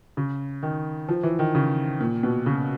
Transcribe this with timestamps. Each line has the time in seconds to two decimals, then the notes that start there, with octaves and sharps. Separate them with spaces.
0.17 C#3
0.63 D#3
1.09 F3
1.23 E3
1.39 D#3
1.55 C#3
2.01 A#2
2.23 B2
2.46 C#3